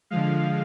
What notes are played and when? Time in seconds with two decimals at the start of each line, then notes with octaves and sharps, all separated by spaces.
0.10 D3 F3 G#3 F5